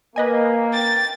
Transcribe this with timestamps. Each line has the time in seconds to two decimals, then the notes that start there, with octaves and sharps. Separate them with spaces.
0.16 A#3 B4 D#5 G#5
0.73 G5 A6